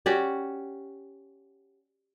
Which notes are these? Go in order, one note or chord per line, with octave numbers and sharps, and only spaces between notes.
C#4 F#4 G4 D5